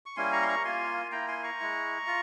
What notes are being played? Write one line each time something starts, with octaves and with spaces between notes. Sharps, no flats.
C#6
G3 A#3 C#4 E4 G#5 C6
A#5 C#6
C6
A#5 C#6
A#3 F4 G#5 C6
A#3 E4 G5 A#5
G#5 C6
A#5 C#6
G#3 E4
F4